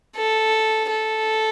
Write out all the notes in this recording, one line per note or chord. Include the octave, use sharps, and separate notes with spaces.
A4
A4